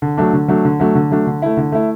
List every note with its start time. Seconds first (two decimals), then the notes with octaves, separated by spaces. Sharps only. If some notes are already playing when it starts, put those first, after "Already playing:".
0.02 D3
0.17 F#3 A3 D4
0.33 D3
0.48 F#3 A3 D4
0.65 D3
0.80 F#3 A3 D4
0.95 D3
1.11 F#3 A3 D4
1.27 D3
1.42 A3 E4
1.57 D3
1.72 A3 E4